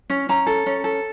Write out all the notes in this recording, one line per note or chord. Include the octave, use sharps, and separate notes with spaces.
C#4
C#4 A#5
A4
C#4
A4